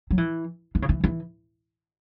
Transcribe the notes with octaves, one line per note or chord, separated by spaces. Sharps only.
F#3
E3
E3
C#3
E3
E3